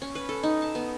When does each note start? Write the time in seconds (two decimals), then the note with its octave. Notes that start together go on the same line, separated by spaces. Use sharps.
0.02 C#4
0.15 B4
0.29 A4
0.43 D#4
0.62 A5
0.75 B3